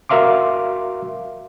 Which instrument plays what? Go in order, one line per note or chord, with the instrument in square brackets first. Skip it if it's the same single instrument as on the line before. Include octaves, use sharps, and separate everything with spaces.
[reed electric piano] F#4 A#4 E5 F5 C6 D6